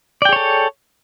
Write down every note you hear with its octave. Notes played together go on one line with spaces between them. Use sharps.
G#4 A4 C#5 D5 G5